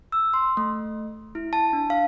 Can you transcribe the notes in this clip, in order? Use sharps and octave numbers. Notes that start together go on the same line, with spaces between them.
E6
C6
A3
E4
A5
D4
F5